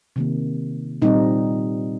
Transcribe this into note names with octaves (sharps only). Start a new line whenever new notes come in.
C3 D#3 A#3
A#2 G3 C4 D#4